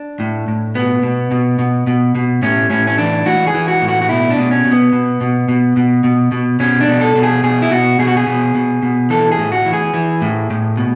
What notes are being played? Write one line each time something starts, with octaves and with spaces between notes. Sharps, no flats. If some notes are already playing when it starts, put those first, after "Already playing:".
Already playing: D4
A2
A2
B2 B3
B2
B2
B2
B2
B2
A2 C#4
A2 C#4
C#4
E3 D4
E3 F#4
G#4
E3
F#4
A2
F#4
F#4
B2 E4
D4
B2
C#4
B2
B3
B2
B2
B2
B2
B2
B2
B2 C#4
D4
B2
A4
B2
G#4
B2 G#4
E4
B2 F#4
B2 G#4
F#4
G#4
B2
B2
B2
E3 A4
G#4
A2
F#4
E3
G#4
E3
A2
A2
B2